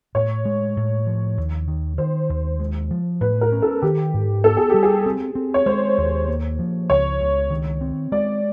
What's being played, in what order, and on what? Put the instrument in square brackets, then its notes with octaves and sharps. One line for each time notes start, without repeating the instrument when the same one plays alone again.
[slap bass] A2 [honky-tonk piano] C#5
[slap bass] G#3
A2
F3
D#2
D#3
[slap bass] D#3 [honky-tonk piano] C5
[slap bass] D#2
G#3
F3
[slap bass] A2 [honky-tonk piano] B4
[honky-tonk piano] A#4
[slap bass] C#4
[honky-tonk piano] A4
[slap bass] D#3 [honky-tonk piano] G4
[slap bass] G#2
[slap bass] B3 [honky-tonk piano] A4
[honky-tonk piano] G#4
[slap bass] G3 [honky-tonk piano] G4
[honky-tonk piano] G#4
[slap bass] C4
C4
[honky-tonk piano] C#5
[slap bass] G#3 [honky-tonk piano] C5
[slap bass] D#2
A#3
F3
[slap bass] C#2 [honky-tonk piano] C#5
[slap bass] C#2
D#3
C4
[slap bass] G#3 [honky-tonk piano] D5